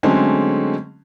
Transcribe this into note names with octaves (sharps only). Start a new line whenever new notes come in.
D3 F#3 G#3 A3 C4 C#4